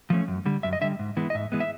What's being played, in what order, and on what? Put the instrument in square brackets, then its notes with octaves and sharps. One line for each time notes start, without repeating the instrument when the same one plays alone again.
[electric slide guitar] F3 A3 C#4
F#2
D3 G3
F#2 E5
D#5
D3 G3 E5
G#2
E3 G#3 B3
D#5
G#2 E5
E3 G#3 B3
E5